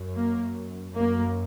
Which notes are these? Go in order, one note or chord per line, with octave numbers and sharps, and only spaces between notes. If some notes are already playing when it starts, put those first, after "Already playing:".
Already playing: F#2
A#3
F#2 A#3